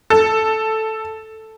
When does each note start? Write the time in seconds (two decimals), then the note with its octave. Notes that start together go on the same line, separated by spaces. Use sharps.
0.10 A4